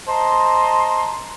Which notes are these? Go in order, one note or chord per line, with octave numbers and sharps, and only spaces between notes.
C5 D#5 A5 A#5 C6